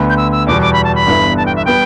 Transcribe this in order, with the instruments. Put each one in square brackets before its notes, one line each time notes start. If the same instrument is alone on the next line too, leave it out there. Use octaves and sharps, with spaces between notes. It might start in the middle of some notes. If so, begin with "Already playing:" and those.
Already playing: [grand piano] D2 D3 B3
[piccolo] G6
E6
E6
[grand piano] E2 B2 G3 [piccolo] D6
[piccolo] D6
B5
A5
B5
[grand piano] G1 G2 E3 B3 E4
[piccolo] A5
G5
E5
[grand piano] G3 B3 [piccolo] G5